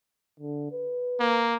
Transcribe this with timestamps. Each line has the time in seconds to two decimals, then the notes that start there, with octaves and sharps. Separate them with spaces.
0.40 D3
0.72 B4
1.20 A#3